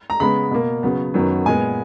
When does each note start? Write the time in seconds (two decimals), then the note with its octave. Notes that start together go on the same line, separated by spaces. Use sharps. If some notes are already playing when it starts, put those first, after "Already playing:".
0.10 A#5
0.20 C#3 G#3 B3 B5
0.51 B2 A#3
0.83 C#3 F#3 B3
1.14 F#2 D#3 F#3 B3
1.46 A#2 G#3 B3 G#5